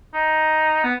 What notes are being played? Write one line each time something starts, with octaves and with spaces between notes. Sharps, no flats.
D#4
B3